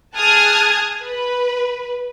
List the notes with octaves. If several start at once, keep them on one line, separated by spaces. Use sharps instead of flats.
G#4 A5 D#6 F6 F#6 G#6
B4